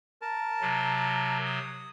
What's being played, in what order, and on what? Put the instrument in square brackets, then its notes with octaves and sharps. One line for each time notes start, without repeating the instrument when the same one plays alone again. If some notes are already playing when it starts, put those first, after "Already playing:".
[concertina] A#4 A5
[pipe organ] C3 F#3
[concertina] D#6